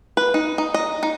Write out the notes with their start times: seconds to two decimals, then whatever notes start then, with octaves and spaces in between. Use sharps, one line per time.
0.17 B4
0.34 D#4
0.58 D#4
0.74 D#5
1.03 D#4